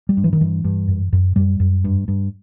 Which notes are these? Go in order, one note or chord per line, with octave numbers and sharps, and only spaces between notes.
G3
G2
E3
D#3
G2 E3
G2
F#2
F#2
F#2 G3
F#2
G2
G2